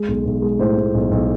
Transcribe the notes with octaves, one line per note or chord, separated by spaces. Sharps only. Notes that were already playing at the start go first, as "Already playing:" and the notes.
Already playing: G#3
B1
B1
G#3
A2 C5
A2
B1
B1